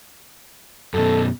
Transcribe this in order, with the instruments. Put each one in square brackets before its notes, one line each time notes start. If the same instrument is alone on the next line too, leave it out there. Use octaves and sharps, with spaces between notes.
[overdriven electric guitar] F#2 B2 [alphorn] A4